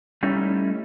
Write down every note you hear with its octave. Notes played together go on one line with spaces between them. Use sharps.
G3 A3 C#4 D#4 E4